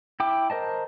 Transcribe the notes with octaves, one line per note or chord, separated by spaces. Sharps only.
E4 G5 D6
A#4 C5 D#5 A5